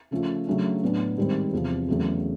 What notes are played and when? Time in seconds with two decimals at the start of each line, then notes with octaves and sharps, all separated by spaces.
0.11 C#3 F3 A3 C#4 F4
0.47 C#3 F#3 A3 D4
0.83 A2 F#3 B3 D4
1.18 G#2 D#3 G3 C4
1.53 E2 C3 F3
1.88 E2 C#3 F#3 A3